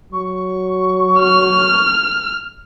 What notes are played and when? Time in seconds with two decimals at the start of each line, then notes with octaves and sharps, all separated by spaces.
0.13 F#3 C#6
1.19 F6